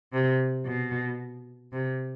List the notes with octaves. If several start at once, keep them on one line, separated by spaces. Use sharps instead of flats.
C3
B2
C3